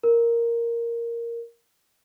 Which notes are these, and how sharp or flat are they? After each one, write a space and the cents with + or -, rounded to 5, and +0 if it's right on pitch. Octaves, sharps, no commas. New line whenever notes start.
A#4 +0